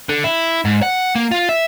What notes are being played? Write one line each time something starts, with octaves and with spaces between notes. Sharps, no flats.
D3
E4
G#2
F#5
A#3
F4
E5